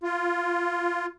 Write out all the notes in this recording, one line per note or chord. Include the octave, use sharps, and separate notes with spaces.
F4